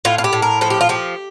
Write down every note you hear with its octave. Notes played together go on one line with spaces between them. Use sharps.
A2 F4
F4
G4
A2
A#4
F3 A4
G4
F4
F3 G4